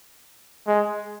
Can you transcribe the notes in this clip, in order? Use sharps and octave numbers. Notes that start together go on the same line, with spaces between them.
G#3